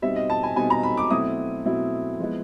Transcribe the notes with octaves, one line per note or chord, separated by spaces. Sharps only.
B2 G3 C4 D#4 E5
D#5
A5
G#5
B2 G3 C4 D#4 G#5
A#5
B5
D6
B2 F#3 A3 C4 E4 D#6
B2 F#3 A3 C4 E4
F3 G#3 B3 E4